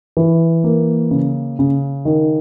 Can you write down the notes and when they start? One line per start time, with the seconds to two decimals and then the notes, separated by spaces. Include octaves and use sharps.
0.17 E3
0.64 A#3
1.11 C#3
1.59 C#3
2.05 D#3